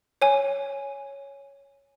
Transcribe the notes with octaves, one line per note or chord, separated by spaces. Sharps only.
C#5 G#5